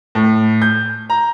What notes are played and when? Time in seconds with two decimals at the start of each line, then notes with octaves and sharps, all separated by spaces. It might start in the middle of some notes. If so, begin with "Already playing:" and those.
0.15 A2
0.62 G6
1.10 A#5